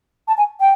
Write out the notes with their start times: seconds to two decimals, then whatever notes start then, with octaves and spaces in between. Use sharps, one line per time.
0.27 A5
0.37 G#5
0.60 G5